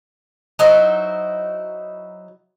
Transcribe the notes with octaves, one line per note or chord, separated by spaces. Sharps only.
F#3 D#4 E4 C5